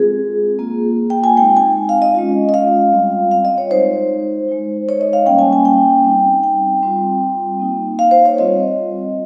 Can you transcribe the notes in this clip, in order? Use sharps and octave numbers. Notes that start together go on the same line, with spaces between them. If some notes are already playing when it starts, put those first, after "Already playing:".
Already playing: G#3 C4 F4 G#4
A#3 F4
G5
G#5
G#3 C4 D#4 G5
G#5
F5
D#5
G#3 C#4 F4
D#5
F5
G3 C4 F4
F5
D#5
C#5
G#3 D#4 C5
G#3 D#4
C#5
D#5
F5
G3 A#3 C#4 G5
G#5
G#5
G5
G3 C4 D#4
G5
G3 C4 F4
A#3 D#4
F5
C5
C#5
G3 C4 F4 D#5